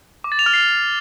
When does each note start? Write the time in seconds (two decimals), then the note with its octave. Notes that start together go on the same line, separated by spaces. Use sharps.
0.24 D6
0.32 A6
0.39 F7
0.46 F6
0.54 C7